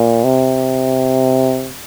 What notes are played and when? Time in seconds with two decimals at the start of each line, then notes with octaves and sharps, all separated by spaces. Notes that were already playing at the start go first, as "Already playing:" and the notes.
Already playing: A#2
0.24 C3